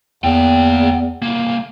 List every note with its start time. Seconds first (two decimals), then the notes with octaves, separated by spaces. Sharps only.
0.24 E2 A#3 G5
1.22 C2 A#3